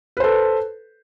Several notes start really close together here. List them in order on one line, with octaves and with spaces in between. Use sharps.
B4 C5 A4